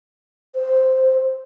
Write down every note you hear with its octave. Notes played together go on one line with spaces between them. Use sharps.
C5